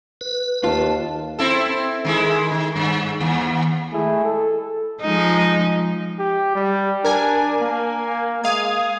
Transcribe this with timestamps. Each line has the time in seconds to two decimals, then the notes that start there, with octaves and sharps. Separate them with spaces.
0.21 B4
0.64 D#2 F4 A5
1.39 C4 E4 A4
2.05 D#3 G#3 E4
2.51 D#3
2.76 G2
3.20 D#2
3.92 G#3 A3 E4 G#4
4.24 A4
5.01 F3 G#3 D#4
6.19 G4
6.56 G3
7.05 D4 A#4 G#5
7.62 A#3
8.44 G#3 F5 D#6 G#6